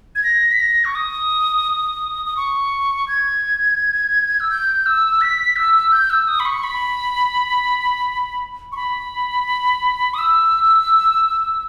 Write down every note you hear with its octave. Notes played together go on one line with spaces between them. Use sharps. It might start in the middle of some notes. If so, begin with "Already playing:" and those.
G#6
A#6
B6
A#6
C#6
D#6
D#6
C#6
G#6
E6
G6
E6
B6
E6
G6
E6
D#6
B5
C#6
B5
C#6
B5
D#6
E6